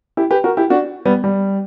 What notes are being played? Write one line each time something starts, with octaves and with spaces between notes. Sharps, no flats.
E4 G4
G4 B4
F#4 A#4
E4 G4
D4 F#4
G3 B3
G3